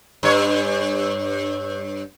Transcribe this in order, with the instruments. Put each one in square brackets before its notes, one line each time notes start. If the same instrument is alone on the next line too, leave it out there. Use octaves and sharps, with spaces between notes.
[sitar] G2 C#5